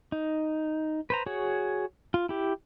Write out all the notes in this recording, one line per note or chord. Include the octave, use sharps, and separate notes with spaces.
D#4
B4 C5 A#5
F#4 G#4 C#5
F4
E4 G4